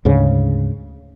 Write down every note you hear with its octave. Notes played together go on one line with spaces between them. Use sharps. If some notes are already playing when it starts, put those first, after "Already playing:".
D2 G#2 C#3